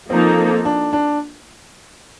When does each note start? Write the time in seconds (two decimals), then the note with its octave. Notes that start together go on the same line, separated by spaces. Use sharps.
0.10 F3 A#3 C4 D#4 A4
0.65 D4
0.93 D4